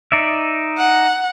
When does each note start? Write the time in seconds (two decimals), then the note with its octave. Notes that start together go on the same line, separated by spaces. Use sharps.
0.12 D#4 D5 E5
0.78 F#5